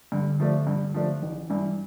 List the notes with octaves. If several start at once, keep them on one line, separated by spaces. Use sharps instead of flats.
G2 D3
F3 A3 D4
G2
F3 A3 D4
A1 E3
G2 E3 G3